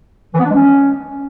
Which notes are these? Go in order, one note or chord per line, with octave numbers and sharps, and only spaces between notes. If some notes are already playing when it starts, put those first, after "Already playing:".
E3
B3
D4
G#3
C#4